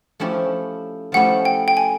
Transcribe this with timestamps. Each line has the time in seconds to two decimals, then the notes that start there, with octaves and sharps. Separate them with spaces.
0.20 F3 A3 C#4 E4 G4
1.12 F3 A3 C#4 E4 G4 F#5
1.45 G5
1.68 G5
1.77 G#5